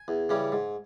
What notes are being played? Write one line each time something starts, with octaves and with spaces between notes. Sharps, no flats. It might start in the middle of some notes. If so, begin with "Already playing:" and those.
Already playing: G#5
E2
C#3 E3 G3 C#4
G#2